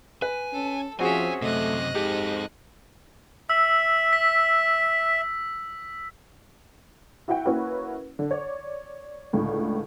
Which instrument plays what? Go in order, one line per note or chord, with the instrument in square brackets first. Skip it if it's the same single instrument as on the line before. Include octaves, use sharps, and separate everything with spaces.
[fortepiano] B4 [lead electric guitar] G#5
[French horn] C#4 [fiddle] A4
[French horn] F3 [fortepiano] C4 F#4 G#4 [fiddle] C#4 E5 [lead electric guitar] G#5
[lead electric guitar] F#2 C3 [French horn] A3 [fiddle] D#5 F#6
[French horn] G#2 [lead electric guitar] C4 A4 [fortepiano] G4
[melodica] E5 [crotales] E6
[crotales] B6
[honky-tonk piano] E4 F#4 E5 F#5 G5
A#3 C#4 E4 F#4 B4
D3
C#5 D5
C#2 A2 D3